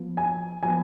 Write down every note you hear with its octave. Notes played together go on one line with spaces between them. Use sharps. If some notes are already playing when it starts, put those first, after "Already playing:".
Already playing: F3 B3
G#5
F3 B3 G#5